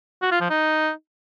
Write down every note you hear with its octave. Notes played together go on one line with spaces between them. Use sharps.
F#4
F4
F3
D#4